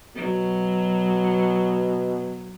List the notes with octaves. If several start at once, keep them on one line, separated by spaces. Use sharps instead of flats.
B2 F#3